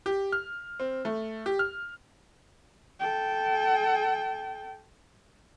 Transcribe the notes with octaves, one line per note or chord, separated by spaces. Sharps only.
G4
F6
C4
A3
G4
F6
A4 G5